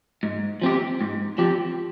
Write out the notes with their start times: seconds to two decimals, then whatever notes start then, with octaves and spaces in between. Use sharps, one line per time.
0.23 G#2
0.62 F3 C4 G4
1.01 G#2
1.38 F3 C4 G4